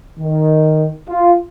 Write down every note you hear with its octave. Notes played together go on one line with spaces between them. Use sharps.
D#3
F4